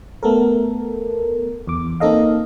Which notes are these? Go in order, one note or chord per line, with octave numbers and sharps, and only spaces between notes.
A3 B3 A4 A#4
E2 D6
A#3 C4 D#4 A4 D#5 F5